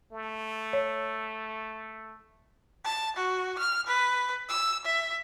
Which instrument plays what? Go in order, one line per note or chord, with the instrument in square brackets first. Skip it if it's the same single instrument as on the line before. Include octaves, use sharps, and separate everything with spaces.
[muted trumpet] A3
[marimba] C#5
[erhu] A5
F#4
F6
B4
E6
E5